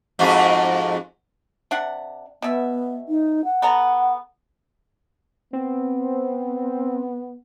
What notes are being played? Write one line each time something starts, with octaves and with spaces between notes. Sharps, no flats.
F2 G#2 F#4
C3 D4 F#5
B2 B3 E5
D#4
F#5
B3 A4 A#5
B3 C4